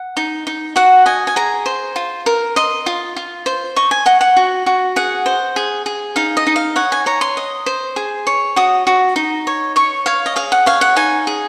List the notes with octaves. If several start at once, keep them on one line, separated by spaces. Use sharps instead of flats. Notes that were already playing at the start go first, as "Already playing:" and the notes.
Already playing: F#5
D#4
D#4
F#4 F#5
D#5 G#5
G#5
G#4 A#5
C5
F4
A#4
D#5 C6
F4
F4
C5
D#5 C#6
G#5
D#5 F#5
F#5
F#4
F#4
G#4 F#5
C5
G#4
G#4
D#4 F5
D#5
D#4
F5
C#5 F#5
G#5
C#5 A#5
C6
D#5
C5
G#4
C#5
F#4 D#6
F#4
D#4
C#5
C#5 C#6
C#5 F5
D#5
G#4 F5
F#5
C#5 F5
F#5
D#4 G#5
G#4